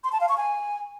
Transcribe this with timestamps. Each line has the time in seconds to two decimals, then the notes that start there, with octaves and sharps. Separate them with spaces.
0.04 C6
0.12 A5
0.21 F5
0.29 C#6
0.37 G#5